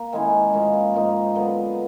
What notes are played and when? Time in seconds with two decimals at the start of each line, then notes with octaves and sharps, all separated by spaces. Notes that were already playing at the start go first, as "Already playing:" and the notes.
Already playing: A#3
0.13 D#3 G#3 C#4 E4
0.54 G#2 F3 A#3
0.94 G#2 F3 A#3 D#4
1.35 D3 F#3 B3